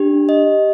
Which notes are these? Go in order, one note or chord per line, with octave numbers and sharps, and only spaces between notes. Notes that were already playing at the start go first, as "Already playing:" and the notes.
Already playing: D4 G4
D#5